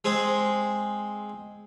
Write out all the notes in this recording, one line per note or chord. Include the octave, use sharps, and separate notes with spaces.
G#3 C4 G#4